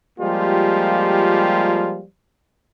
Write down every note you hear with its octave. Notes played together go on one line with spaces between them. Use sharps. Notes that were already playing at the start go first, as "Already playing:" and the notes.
F3 G3 G#3 A#3 F4 G4